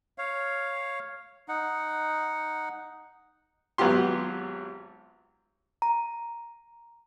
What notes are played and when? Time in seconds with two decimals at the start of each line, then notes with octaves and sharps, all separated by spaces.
0.18 C#5 F5
1.48 D#4 F#5
3.78 G#1 F#3 B3 F4 G4 C6
5.82 A#5